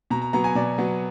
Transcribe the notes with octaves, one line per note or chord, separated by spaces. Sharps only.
B2 A#5
A#5
F#3 B3 A#5
G#5
B2 D5
F#3 B3